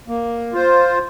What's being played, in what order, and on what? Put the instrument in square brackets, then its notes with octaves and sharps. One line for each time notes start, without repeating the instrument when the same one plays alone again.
[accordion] A#3
F4 C5